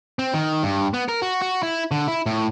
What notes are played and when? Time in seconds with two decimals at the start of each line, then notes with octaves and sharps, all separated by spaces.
0.19 C4
0.34 D#3
0.63 G2
0.94 B3
1.09 A#4
1.22 F#4
1.42 F#4
1.63 E4
1.91 D3
2.08 E4
2.26 A2